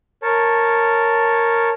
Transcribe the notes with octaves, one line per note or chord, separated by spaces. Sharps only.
A#4 C#5 A5